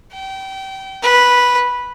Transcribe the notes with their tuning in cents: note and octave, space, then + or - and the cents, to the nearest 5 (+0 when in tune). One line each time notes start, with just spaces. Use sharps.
G5 -25
B4 -5